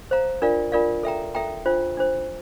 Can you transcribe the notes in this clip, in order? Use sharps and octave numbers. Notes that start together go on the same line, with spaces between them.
C5 F5 A#5
D4 F4 A#4 D5 F5
D4 F4 A#4 D5 F5
A4 E5 G5 A#5
A4 E5 G5 A#5
D4 F4 C5
D4 F4 C5